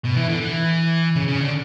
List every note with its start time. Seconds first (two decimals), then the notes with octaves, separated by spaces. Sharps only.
0.04 B2
0.16 E3
0.28 D3
0.41 E3
1.16 C#3
1.28 C#3
1.41 D3